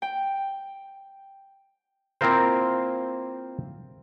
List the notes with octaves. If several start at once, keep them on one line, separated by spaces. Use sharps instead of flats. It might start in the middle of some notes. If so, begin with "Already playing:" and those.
G5
A#3 C4 E4 F4 A#4 C5